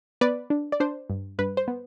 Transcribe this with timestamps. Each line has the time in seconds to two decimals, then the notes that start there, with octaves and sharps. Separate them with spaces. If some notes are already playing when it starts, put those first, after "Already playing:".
0.21 B3 B4 D5
0.50 D4
0.72 D5
0.80 D4 C5
1.10 G2
1.39 G2 B4
1.57 C5
1.68 B3